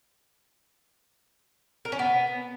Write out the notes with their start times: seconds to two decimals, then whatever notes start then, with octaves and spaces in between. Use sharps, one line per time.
1.85 A#4
1.92 C#4
1.99 B3